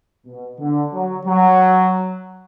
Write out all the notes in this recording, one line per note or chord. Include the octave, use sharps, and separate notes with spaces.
B2
D3
F#3
F#3